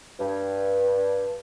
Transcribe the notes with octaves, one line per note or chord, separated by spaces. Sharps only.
G2